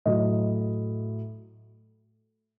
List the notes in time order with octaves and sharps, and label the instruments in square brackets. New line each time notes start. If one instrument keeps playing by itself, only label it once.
[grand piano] A2 F#3 D#5